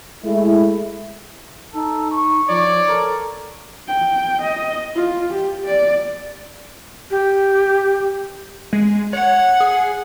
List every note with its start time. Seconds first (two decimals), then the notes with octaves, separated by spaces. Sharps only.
0.24 G#3 A3 E4
1.74 D#4 A4
2.12 C#6
2.49 F3 C#5 D5
2.88 A4 A#4
3.88 G5
4.41 D#5
4.95 F4
5.33 G4
5.66 D5
7.10 G4
8.73 G#3
9.13 C#5 F#5
9.60 G#4